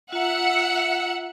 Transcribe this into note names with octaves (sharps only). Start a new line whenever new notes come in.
F4 E5 F#5 A#5 E6 C#7